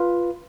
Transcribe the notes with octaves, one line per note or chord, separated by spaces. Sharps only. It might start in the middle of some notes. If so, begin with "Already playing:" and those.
Already playing: F4 B4